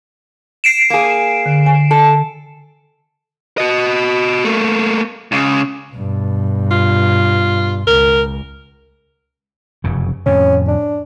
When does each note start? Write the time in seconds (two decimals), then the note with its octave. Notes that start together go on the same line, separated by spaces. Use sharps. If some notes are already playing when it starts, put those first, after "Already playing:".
0.64 C7 D7 E7
0.90 A#3 G#4
1.46 D3
1.66 G#5
1.91 A4
3.58 F#4 D#5
4.44 A3 A#3
5.32 C#2 C#3
5.92 G2 B2
6.71 F4
7.87 C#2 A#4
9.84 F1 F#2 C#3
10.26 F2 A2 C3 C#4
10.68 D4